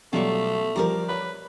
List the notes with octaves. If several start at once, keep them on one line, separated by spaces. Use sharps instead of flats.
B2 F#3 G3 A3 F4 D5 C#6
F3 G3 G4 A#4 D5 A#5
B4 C#5